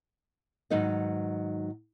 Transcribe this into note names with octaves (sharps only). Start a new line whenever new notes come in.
G#2 D#3 F#3 D#4 B4 D#5